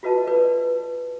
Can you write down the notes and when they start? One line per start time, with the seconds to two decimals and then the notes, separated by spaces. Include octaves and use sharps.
0.03 F4 F#4 B4 D#5 A5
0.27 B4 D5